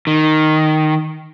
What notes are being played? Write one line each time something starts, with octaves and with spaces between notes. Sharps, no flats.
D#3